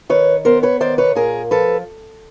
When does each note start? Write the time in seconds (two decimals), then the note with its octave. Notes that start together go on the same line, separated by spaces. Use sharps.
0.09 D#3 B4 C#5
0.45 B3 A#4 C5
0.63 B4 C#5
0.80 D#3 C5 D5
0.98 B4 C#5
1.15 A#2 G#4 A#4
1.51 F3 A4 B4